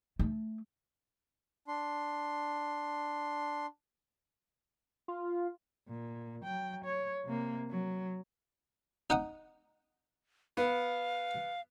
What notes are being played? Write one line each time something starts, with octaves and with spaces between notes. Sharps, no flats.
A3
D4 C6
F4
A#2
F#3 G5
C#5
C3 A#3
F#3
D#4 F#5 D#6
B3 F5